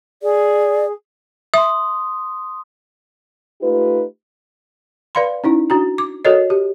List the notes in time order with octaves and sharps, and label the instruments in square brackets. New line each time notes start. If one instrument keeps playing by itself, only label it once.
[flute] G#4 [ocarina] D5
[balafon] E5 [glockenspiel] C6 D#6
[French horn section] A3 D#4 F4 G4 B4
[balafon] B4 D5 F5 B5 C6
C#4 D#4 E4
D4 F#4 A#5
D6
F#4 A4 A#4 C#5 D#5
G4